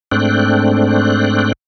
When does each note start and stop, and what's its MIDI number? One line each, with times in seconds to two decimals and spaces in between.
0.12 1.52 44
0.12 1.52 57
0.12 1.52 60
0.12 1.52 62
0.12 1.52 79
0.12 1.52 90